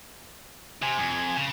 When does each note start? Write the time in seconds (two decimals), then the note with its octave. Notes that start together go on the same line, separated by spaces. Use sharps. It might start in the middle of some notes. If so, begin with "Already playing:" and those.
0.82 C3 G#5
0.99 F2
1.36 C#3